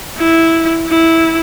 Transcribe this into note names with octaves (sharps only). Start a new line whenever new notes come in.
E4
E4